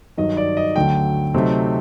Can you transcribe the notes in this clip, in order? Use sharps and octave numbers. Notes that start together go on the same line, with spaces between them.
G2 D#3 F#3 D#5
D5
D#5
D2 D3 F#3 A3 G5
C3 F#3 A3 C4 D#4